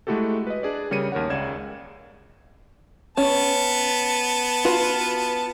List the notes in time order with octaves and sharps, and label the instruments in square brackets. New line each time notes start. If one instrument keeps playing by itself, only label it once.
[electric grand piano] G#3 A3 E4 F#4 G4 A4
B4 D#5
D4 G#4 D5
C#3 G3 A#4 C#5 C#7 D#7
D#2 A#4 C#5 F#5
C#2 C#3 D5 G#6 E7
[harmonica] B3 A5 [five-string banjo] C#4
[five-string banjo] F4 F#4 B4